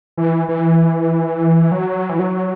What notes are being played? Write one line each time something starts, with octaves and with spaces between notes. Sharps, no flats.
E3
E3
F#3
E3
F#3